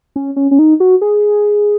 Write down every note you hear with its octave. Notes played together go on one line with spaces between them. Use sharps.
C#4
C#4
C#4
D#4
F#4
G#4